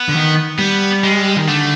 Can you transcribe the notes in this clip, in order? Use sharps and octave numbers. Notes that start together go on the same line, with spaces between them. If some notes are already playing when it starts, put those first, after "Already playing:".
Already playing: B3
D3
D#3
G3 B3
G#3
D#3
D3 A3